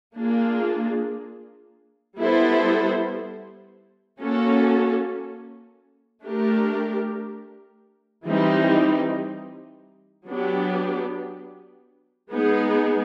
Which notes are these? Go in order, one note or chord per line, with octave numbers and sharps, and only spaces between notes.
A#3 D4 F4 G#4
G3 B3 E4 A4 C5
A#3 C#4 F#4 A4
A3 D4 G4 A#4
E3 G3 C4 D#4 G4
F#3 B3 D4 G4
G#3 B3 D#4 G#4